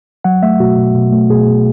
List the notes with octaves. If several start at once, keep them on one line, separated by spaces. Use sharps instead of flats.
F#3 F#5
A3 E5
B2 F#4
B2
B2
A3
B2 G#4
B2